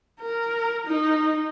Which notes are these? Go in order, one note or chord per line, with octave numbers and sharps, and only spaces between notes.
A#4
D#4